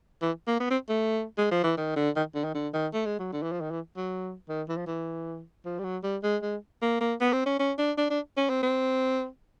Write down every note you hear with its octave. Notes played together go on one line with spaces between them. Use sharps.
E3
A#3
B3
C4
A3
G#3
F3
E3
D#3
D3
D#3
D3
D#3
D3
D#3
A3
G#3
F#3
D3
E3
F3
D#3
E3
F#3
D#3
E3
F3
E3
F3
G3
F#3
G3
G#3
G#3
A#3
A#3
B3
C4
C#4
C#4
D4
D4
D4
C#4
C4
C4